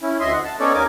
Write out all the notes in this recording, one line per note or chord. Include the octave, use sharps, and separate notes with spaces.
C#4 E4
D2 D#5 E5 C6
F#5
A5
B3 C#4 D#4 A4 C#5 D5
D#2 A#3 A#4 G#5 D6